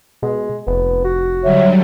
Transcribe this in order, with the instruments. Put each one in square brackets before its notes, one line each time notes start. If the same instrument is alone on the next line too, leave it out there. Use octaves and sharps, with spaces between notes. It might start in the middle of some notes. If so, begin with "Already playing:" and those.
[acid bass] B2 [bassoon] G#3
[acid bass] F1 [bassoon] B3
[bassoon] F#4
[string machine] D3 F#3 G3 [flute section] C#5 E5